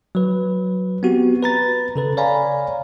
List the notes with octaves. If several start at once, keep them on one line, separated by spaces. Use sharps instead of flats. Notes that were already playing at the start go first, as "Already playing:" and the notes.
F#3 B4
B3 C4 F#4 G4
B4 A#5 A6
C#3 A4 B4
C#5 D5 F5 G#5 A#5 B5